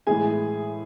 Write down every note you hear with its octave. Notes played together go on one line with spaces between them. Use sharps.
A2 E3 G#3 G#4 G#5